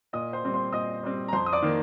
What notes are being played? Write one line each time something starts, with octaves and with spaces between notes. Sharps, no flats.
A#2 D#5 D#6
C5 C6
G3 C4
C5 C6
A#2 D#5 D#6
G3 C4
A#5
F2 C5 C6
D#6
D5 D6
D#3 A#3